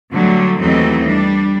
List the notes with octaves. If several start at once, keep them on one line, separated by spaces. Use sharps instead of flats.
D3 F#3 G3 A3
D#2 E3 F#3 A3 C4 D#5
G3 D4